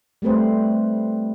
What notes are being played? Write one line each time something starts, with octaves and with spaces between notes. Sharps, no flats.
G3 A3 C4 B4 C5